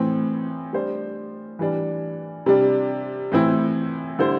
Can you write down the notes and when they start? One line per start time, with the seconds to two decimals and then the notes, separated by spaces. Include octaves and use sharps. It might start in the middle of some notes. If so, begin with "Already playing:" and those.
Already playing: A2 E3 C4
0.73 G3 D4 C5
1.59 E3 G3 D4
2.46 C3 G3 D4
3.32 A2 E3 C4 E4
4.19 D3 G3 E4 A4 C5